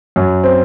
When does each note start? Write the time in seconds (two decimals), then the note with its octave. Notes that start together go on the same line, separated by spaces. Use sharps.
0.16 F#2
0.44 C4